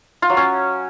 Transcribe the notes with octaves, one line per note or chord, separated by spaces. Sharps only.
F4
F#3
C#4